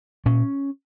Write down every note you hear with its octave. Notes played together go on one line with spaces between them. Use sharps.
A#2 C#4